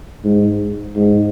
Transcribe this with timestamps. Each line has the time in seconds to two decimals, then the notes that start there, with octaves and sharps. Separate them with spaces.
0.24 G#2
0.96 G#2